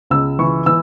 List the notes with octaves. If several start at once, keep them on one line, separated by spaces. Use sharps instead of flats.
C#2 E6
E3 C#6
E3 E6